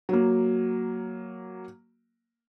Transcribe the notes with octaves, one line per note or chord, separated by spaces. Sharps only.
F#3 A#3